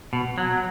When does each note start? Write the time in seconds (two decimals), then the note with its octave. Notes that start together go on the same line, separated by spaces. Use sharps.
0.13 B2
0.38 F#3